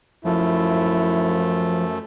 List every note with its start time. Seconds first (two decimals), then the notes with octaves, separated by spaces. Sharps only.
0.24 F#2 F3 A3 E4